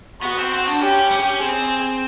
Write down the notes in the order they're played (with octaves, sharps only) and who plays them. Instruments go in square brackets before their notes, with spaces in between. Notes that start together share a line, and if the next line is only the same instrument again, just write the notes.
[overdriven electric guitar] B3 [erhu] F#4
[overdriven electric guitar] C4
C4
D4
[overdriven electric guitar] C#4 [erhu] G4
[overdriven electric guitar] C#4
[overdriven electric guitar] C4 [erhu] G#4